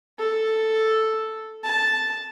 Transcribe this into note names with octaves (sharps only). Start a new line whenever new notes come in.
A4
A5